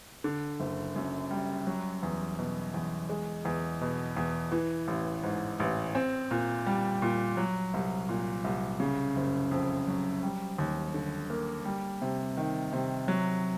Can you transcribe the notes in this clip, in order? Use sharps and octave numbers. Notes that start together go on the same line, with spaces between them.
D3
F#1
F#2
G3
F#3
E2
B2
E2
G#3
E2
B2
E2
E3
A1
G#2
A1
C4
A#2
G3
A#2
F#3
C2
A#2
C2
C#3
F#1
F2
F#3
G3
D#2
D3
A#3
G3
C3
D#3
C3
F#3